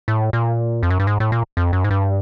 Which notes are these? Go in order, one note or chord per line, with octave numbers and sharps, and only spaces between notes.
A2
A#2
F2
F#2
G2
G#2
A2
A#2
F2
F#2
G#2
G2